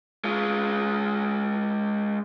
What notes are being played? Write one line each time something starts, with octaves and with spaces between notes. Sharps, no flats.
G#3 F4